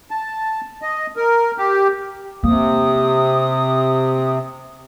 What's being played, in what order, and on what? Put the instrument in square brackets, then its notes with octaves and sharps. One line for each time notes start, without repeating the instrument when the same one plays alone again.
[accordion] A5
D#5
A#4
G4
[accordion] C3 [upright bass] A#3 [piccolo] D#6